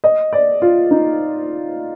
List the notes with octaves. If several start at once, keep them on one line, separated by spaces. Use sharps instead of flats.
D#5
D5
F4
D#4